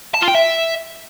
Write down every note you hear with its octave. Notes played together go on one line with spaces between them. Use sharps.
A5
F4
G5
E5